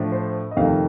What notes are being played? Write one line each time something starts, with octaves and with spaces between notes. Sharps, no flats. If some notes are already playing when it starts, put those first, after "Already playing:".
Already playing: A2 F3 A3 D4
C5
D#5
F2 C3 D#3 A3 F5